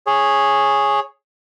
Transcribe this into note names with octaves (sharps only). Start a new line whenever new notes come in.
G#4 C#5